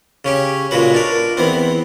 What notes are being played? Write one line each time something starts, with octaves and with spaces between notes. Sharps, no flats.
C#3 C#4 G4
A#2 C#3 G#3 F#4 B4
D4 A#4
E2 E3 B3 C4